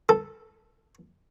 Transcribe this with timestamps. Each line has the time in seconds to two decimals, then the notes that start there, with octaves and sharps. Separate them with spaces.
0.09 A4